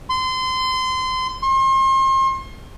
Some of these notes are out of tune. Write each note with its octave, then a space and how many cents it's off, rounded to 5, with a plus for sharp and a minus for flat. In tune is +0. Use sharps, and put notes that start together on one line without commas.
C6 -25
C6 +40